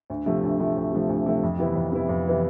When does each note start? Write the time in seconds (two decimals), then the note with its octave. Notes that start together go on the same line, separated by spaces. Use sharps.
0.10 D2
0.26 C3 F3 A3
0.43 D2
0.59 C3 F3 A3
0.76 D2
0.92 C3 F3 A3
1.09 D2
1.26 C3 F3 A3
1.43 F2
1.59 C3 E3 B3 E4
1.75 F2
1.92 C3 E3 B3 E4
2.09 F2
2.26 C3 E3 B3 E4